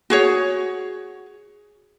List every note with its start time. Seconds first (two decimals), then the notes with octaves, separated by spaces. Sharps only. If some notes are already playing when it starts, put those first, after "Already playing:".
0.10 F#4 G#4 C#5